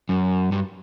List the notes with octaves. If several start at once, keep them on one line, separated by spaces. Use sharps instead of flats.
F#2
G2